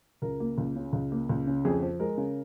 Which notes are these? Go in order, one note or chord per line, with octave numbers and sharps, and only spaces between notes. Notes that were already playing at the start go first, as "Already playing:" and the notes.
C#2 A#4
A#3
C#2
C#3
C#2
A#3
C#2
C#3
F2 G#4
F3
G#3 A#4
C#3